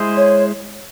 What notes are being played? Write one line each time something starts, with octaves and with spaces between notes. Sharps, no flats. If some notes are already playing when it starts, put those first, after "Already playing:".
Already playing: G#3 E4 G#4 C5
C#5